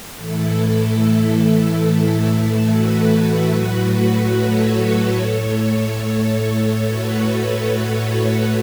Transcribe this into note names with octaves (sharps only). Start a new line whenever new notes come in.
A2 E3 A3 E4 A4
A2 E3 A3
F#4 B4
A2 F#3 A3
A4 C#5
A2 A3
A2 A3 F#4 B4